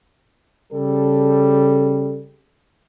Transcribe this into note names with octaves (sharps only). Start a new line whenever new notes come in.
C#3 G3 A4